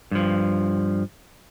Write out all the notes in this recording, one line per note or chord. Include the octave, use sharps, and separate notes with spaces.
G2 F3